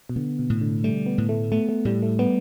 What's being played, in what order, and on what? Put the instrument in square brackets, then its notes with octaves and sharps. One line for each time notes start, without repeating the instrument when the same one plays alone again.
[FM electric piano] B2
[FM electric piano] D3 [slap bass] B3
[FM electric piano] B2
[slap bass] A2
[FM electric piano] D3
[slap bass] G3 [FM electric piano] A3
[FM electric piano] B3
[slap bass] A2
[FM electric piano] A3
[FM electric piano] A3 [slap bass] B3
[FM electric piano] A3
[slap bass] A2 [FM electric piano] G3
[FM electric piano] A3
[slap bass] G3 [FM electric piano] B3